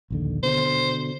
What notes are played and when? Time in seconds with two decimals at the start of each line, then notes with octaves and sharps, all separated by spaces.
0.10 A#1 D#2 D3
0.43 B2 D3 C5